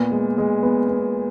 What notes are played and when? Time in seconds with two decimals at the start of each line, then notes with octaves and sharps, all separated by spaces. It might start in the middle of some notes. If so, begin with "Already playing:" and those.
Already playing: A#2 B3
0.11 G#3
0.38 G#3
0.63 B3
0.89 B3